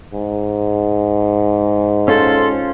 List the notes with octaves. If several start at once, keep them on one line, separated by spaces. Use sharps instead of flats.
G#2
C#4 F4 A4 C5